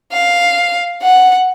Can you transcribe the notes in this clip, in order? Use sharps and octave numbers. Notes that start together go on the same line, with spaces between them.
F5
F#5